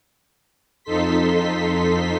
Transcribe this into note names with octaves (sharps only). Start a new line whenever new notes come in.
F2 D#4 A4 C6 B6